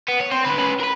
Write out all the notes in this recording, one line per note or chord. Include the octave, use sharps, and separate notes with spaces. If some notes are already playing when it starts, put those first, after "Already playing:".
B3
C#5
C4 C5
D3 B4
C#4 B4
A#4 B4